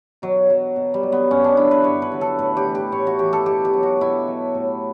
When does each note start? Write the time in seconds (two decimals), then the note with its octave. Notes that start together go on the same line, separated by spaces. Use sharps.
0.22 B2 F#3
0.50 F#3
0.76 B2
0.94 G3
1.03 F#3
1.12 B3
1.31 G2 C#4
1.44 D4
1.57 D3 F#3 E4
1.71 B4
1.84 G2 C#5
2.02 B4
2.12 D3 F#3
2.21 A4
2.39 A2 B4
2.57 G4
2.66 E3
2.75 G4
2.92 A2 C#5
3.07 F#4
3.19 E3 G4
3.33 A4
3.46 B2 G4
3.65 G4
3.73 F#3
3.83 F#4
4.01 B2 E4
4.28 F#3
4.55 A2